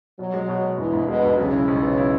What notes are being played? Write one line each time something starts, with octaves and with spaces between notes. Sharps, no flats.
B2 F#3
G#3
B2
G#3
E1 E3
E1
B2 G#3
E1
B1 C#3
E4
B1
B3
E4